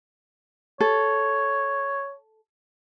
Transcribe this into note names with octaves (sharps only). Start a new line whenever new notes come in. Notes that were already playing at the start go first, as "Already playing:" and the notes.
A4 C#5